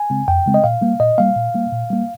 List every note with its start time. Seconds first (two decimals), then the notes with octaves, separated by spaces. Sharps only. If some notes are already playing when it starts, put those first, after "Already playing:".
Already playing: G#5
0.10 C#3 G#3 C4
0.28 F2 G5
0.47 C#3 G#3 C4
0.54 D#5
0.64 A#2 F5
0.81 G3 A#3
1.00 A#2 D#5
1.18 G3 A#3 F5
1.36 A#2
1.54 G3 A#3
1.72 A#2
1.90 G3 A#3